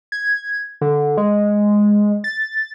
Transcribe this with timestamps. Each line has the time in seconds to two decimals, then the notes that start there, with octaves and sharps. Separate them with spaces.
0.12 G#6
0.81 D3
1.17 G#3
2.24 A6